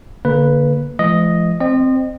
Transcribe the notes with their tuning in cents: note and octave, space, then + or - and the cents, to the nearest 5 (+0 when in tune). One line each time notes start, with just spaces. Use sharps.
D3 -25 A#3 +0 B4 +0
F3 -40 G#3 +45 D#5 +0
C4 +0 D#5 -35